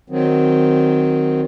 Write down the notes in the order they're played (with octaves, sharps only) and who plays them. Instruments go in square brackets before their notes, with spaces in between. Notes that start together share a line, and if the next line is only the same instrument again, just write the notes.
[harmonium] D#3 F#3 C4